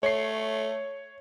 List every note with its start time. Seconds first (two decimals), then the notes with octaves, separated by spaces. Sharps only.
0.03 A3 C#5 C7